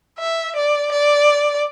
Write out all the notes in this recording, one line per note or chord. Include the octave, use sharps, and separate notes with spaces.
E5
D5
D5